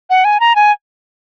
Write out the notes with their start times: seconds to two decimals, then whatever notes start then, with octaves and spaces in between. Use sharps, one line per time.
0.10 F#5
0.25 G#5
0.40 A#5
0.56 G#5